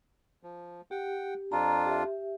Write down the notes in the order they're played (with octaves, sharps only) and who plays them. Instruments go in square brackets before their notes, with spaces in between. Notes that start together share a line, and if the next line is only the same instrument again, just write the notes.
[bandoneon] F3
[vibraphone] G4 [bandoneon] F#5 G5
[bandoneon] F2 D4 F4 [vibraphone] A#5
[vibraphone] G4 E5